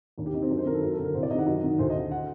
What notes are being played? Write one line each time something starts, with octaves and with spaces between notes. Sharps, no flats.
D#2 D4
G4
D#3 D#4
C4
F#2 D4
C5
D#3 A#4
A4
F#2 A#4
A4
D3
A#4
C2 C5
D5
C3 D#3 D#5 F#5
F#2 D#5
D#3
D2 C5
D#5
D3
F#5